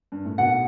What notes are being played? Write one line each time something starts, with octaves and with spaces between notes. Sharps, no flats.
G2
A2
B1 B2 F#5